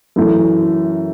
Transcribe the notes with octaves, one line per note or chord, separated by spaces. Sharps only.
F#2 E3 A3